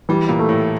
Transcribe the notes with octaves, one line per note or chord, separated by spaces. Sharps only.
E3 G3
A#2
A3
A2